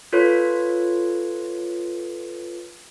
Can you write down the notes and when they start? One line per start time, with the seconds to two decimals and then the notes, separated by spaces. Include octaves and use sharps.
0.13 F4 A4 B4 C#5